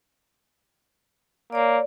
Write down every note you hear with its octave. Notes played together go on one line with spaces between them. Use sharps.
A#3 C#5 D5